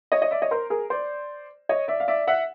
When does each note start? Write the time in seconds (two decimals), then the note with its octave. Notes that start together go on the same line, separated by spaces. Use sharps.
0.12 C#5 D#5
0.22 C#5 D#5
0.31 D5 E5
0.42 C#5 D#5
0.51 A#4 C5
0.70 G#4 A#4
0.90 C5 D5
1.69 C#5 D#5
1.88 D5 E5
2.00 F5
2.08 D5 E5
2.27 E5 F#5